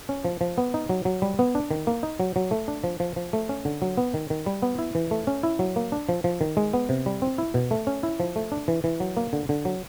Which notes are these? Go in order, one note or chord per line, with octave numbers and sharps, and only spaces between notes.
C#4
F3
F3
B3
D#4
F#3
F#3
G3
B3
D4
D#3
A#3
D#4
F#3
F#3
A3
D4
F3
F3
F3
A3
C#4
D3
F#3
B3
D#3
D#3
G3
B3
E4
E3
A3
C#4
E4
F#3
A#3
D4
F3
F3
D#3
G#3
B3
C3
G3
C4
E4
B2
A3
C#4
E4
F3
A3
D4
E3
E3
F#3
A#3
D3
D3
F#3